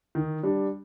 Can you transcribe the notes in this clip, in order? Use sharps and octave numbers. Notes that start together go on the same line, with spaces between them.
D#3
G3 D4